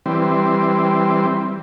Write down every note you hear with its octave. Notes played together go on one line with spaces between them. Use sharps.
E3 G3 C4